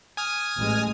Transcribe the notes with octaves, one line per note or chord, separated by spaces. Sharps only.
G#5 D#6 F6
A1 G#3